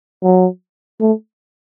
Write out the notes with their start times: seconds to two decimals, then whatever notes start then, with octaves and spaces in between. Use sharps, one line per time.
0.23 F#3
1.00 A3